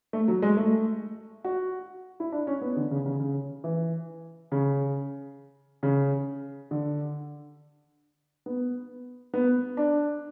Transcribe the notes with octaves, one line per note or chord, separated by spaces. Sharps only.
A3
F#3
G#3
A3
F#4
E4
D4
C#4
B3
D3
C#3
C#3
C#3
E3
C#3
C#3
D3
B3
B3
D4